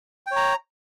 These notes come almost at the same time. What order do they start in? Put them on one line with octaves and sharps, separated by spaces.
G5 C#5 A#5